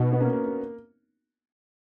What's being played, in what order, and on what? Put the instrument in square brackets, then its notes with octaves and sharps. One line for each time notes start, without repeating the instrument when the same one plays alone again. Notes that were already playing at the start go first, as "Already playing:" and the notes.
Already playing: [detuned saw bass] B2 [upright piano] D#4 F#4
[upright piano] B3
A#3 C#4
A#3
A#3